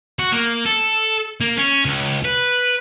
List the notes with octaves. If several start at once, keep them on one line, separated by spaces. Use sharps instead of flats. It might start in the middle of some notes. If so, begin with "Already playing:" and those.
F#4
A#3
A4
A#3
C#4
C#2
B4